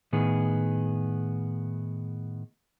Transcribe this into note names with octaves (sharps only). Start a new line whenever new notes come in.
A2 D#3 B3 G#4